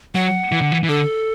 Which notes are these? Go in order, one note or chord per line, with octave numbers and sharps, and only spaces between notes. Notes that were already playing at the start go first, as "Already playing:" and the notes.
F#3 F#5
E3
D3
E3
E3
D3 A4